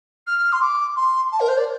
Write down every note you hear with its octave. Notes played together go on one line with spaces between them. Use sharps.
F6
C6
D6
C6
A5
A#4
C5
D5